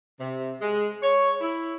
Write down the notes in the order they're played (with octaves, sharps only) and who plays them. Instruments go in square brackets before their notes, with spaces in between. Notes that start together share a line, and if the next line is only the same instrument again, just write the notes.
[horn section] C3
G#3
C#5
E4